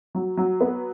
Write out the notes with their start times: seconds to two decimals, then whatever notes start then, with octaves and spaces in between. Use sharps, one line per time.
0.15 F#3
0.37 F#3
0.61 B3